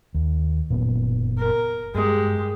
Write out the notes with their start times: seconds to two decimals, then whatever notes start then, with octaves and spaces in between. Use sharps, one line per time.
0.14 D#2
0.70 F#1 A#2 B3
1.38 A#4
1.95 G2 G#3 G4